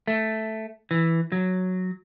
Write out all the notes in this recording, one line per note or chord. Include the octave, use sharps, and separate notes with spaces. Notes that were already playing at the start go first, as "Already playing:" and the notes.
A3
E3
F#3